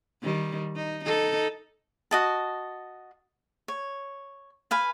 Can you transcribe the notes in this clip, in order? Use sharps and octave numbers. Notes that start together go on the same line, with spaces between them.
D#3 G3
D#4
D#4 A4
F#4 D#5 A5
C#5
B4 F5 G#5